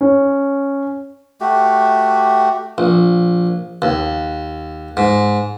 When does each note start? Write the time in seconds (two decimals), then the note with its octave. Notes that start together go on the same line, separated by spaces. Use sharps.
0.01 C#4
1.41 A3 F#4 G4
2.78 A#1
3.82 D#2
4.97 G#2